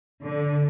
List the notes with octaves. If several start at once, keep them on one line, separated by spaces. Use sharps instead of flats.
D3